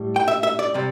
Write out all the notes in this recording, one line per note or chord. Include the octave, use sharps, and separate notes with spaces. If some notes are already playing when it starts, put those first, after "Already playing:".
Already playing: A2 G3
G5
E5
E5
D5
C3 G3